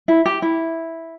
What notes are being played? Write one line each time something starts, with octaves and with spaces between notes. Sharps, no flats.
E4
G4
E4